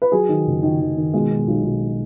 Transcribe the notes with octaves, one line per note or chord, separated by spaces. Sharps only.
B4
F#3 G#4
D#3
F#1
D#3
D#3
D#3
B2 G#3
B2
B1
B1